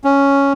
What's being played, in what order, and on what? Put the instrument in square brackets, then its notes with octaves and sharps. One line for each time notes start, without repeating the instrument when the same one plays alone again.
[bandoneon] C#4